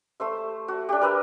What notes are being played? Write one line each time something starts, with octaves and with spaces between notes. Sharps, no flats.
A3 C5 E5
F#4
D4 G4
A#4 B4 E5